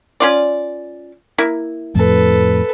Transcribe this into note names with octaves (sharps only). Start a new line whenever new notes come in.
C#4 F4 D5
A#3 E4
F2 A2 A4 B4